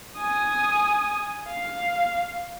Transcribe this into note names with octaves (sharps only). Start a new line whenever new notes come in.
G#5 D#6
F5